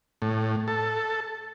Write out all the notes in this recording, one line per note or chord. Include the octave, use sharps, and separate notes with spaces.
A2
A4